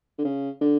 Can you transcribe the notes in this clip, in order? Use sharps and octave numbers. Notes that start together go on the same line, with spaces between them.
D3
C#3
D3